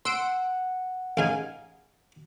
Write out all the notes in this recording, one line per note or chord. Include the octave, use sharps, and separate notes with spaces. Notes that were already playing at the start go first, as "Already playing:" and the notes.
F#5 C6 E6 D7
A1 C#3 D#4 F5 G#5